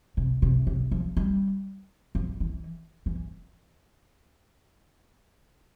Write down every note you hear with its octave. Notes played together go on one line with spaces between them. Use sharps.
C3
C3
C3
F3
G3
F3
E3
E3